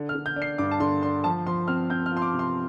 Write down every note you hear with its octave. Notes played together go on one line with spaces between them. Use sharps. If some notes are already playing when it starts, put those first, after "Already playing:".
Already playing: D3
F6
D3
G6
D4
C7
G2 D6
A5
D3 C6
D4 C6
F3 A5
F3 C6
C4 F6
C4 G6
F6
F4
C6
D6
C3
C6